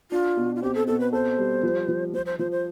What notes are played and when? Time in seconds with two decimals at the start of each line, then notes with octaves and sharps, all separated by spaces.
0.11 D4 F4
0.37 B2
0.56 F4
0.62 C4 G4
0.75 A4
0.87 B2 A4
1.00 B4
1.13 A4 C5
1.38 G3
1.63 F3
1.88 F3
2.13 F3 C5
2.26 C5
2.39 F3 C5
2.51 C5